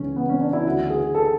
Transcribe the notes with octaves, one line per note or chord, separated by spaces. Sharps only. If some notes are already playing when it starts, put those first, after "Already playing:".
Already playing: C#2 C#3 E3 C#4
B3
C#4
D4
E4
D2 D3 F#4
G#4
A4